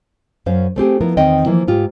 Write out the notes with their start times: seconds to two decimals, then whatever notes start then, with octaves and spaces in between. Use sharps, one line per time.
0.46 F#2 C#4 C5 F5
0.76 A3 C4 G4 G#4
1.01 F3 B3 E4 A#4
1.17 E2 D#3 C4 D#5 G5
1.46 E3 F3 A#3 E4
1.68 G#2 F4 G4